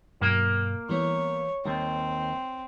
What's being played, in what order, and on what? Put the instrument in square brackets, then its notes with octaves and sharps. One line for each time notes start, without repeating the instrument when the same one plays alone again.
[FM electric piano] G2 B2 F#3 [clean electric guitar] A#3
[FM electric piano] E3 G3 B3 [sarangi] C#5
[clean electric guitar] D#2 [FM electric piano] G3 [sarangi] C4